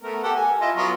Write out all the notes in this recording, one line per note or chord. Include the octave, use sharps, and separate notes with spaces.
A3 B3 A#4
G4 A4 F#5
G#5
E4 F4 D#5
F#3 B3 F4